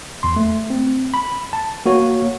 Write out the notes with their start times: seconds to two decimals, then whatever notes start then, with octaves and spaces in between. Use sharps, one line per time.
0.23 E2 C6
0.36 A3
0.70 C4
1.14 B5
1.53 A5
1.86 A#3 F#4 C#5